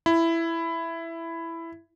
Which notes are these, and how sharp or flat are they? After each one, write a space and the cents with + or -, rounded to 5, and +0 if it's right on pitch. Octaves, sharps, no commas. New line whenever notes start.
E4 +10